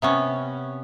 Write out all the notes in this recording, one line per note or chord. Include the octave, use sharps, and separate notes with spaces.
C3 B3 C#4